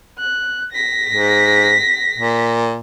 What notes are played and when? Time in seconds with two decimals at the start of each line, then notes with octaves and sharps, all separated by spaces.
0.19 F#6
0.73 A#6 B6
1.10 G#2
2.18 A#2